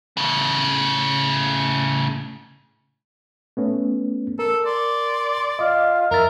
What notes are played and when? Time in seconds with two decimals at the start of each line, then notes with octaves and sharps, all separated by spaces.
0.17 A2 C#3
3.57 A3 B3 C#4
4.39 A4 A#4
4.65 D5 C6
5.59 F4 D#5
6.11 F2 E4 A#4 A6